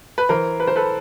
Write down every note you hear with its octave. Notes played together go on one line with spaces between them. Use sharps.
B4
E3 A#4 C5
B4
C5
A4 B4